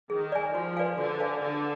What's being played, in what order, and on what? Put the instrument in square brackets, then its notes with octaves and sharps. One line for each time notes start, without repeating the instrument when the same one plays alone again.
[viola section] D#3 [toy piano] G#4
[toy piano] D5 G#5
[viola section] F3 [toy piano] F#4
[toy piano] B4 D5 F5 G#5
[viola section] D3 [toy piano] F#4
[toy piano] B4 D5 F5 G#5
[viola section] D3 [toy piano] B4